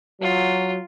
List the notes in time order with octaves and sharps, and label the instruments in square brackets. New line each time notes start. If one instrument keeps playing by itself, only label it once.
[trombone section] F#3 [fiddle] F4